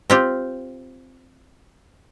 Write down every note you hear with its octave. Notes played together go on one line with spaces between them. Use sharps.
C4 F4 G4